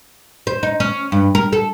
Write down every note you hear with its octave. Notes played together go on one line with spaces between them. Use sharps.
C5
D#4
C#4
G2
A#4
A4